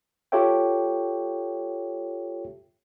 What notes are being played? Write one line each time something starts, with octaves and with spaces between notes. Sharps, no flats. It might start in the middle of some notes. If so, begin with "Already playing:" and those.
F4 G4 A4 C#5 E5 G5